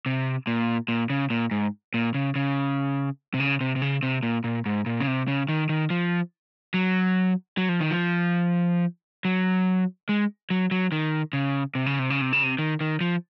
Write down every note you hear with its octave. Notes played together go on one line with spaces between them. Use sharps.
C3
A#2
A#2
C#3
A#2
G#2
A#2
C#3
C#3
C3
C#3
C3
C3
C#3
C3
A#2
A#2
G#2
A#2
C#3
C3
C#3
D#3
D#3
F3
F#3
F#3
F3
D#3
F3
F#3
G#3
F#3
F#3
D#3
C#3
C3
C#3
C3
C#3
C3
C#3
C3
D#3
D#3
F3